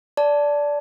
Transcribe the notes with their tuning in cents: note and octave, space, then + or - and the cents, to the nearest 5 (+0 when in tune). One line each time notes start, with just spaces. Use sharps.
D5 -15 A5 +0